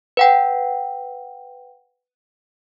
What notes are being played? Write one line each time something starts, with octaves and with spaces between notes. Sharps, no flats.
B4 F#5 G5